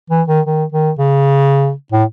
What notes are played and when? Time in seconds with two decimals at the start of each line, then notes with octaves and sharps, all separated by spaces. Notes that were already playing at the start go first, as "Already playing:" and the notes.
0.10 E3
0.28 D#3
0.46 D#3
0.72 D#3
0.99 C#3
1.92 A2